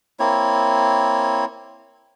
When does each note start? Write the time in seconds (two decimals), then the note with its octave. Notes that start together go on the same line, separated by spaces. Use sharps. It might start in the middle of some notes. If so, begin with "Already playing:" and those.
0.19 A#3 C4 E4 C#5